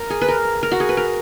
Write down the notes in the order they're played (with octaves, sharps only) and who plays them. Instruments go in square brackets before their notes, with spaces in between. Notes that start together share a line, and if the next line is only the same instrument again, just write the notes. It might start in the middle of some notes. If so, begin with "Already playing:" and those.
Already playing: [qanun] A#4
G#4
B4
A#4
A#4
F#4
G#4
B4
A#4